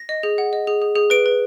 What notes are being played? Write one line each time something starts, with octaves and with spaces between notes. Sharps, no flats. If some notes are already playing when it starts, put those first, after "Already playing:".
Already playing: A#6
D#5
G#4
F#5
D#5
G#4
G#4
G#4
B4 D7
B4